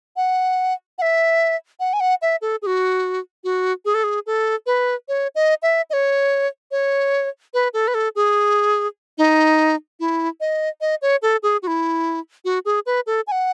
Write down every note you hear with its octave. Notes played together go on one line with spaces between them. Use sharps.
F#5
F#5
E5
F#5
G#5
F#5
E5
A4
G#4
F#4
F#4
G#4
A4
G#4
A4
B4
C#5
D#5
E5
D#5
C#5
C#5
B4
A4
B4
A4
G#4
D#4
E4
D#5
D#5
C#5
A4
G#4
F#4
E4
F#4
G#4
B4
A4
G#5
F#5